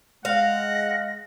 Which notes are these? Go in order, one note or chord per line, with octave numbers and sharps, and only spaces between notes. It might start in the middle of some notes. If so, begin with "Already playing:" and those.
G#3 F5 F#5 A#6